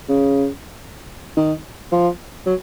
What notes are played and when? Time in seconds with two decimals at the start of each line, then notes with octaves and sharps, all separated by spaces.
0.09 C#3
1.37 D#3
1.92 F3
2.46 F#3